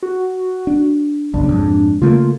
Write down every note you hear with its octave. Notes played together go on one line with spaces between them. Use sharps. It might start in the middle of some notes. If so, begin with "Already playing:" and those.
F#4
D4
B1 F#2 C#3 D4
F2 G#2
C#3 A3 A#3 F4